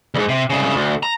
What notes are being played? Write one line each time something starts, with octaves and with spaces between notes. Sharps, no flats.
D2 G#2
C3
C2 C#3
D2
A#5